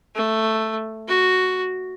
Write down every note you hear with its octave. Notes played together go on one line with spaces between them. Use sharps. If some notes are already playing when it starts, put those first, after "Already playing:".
A3
F#4